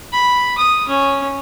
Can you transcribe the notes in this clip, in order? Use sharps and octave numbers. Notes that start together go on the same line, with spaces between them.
B5
D#6
C#4